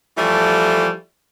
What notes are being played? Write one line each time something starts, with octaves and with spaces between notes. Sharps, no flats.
E3 F3 G3 A3